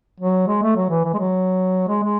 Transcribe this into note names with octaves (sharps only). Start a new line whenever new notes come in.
F#3
G#3
A3
F#3
E3
E3
G#3
F#3
G#3
G#3